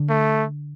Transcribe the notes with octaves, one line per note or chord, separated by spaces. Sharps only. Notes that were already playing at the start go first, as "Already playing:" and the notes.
Already playing: D3
A3